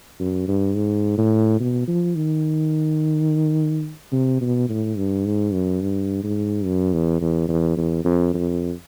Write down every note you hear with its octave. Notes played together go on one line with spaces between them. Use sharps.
F#2
G2
G#2
A2
B2
F3
D#3
C3
B2
A2
G2
G#2
F#2
G2
G#2
F#2
E2
E2
E2
E2
F2
F2